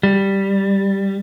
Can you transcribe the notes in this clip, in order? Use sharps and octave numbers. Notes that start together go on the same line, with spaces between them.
G3